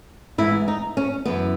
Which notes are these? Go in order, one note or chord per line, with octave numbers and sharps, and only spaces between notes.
G#2 E3 E4
D#4
C#4
F#2 E3 B3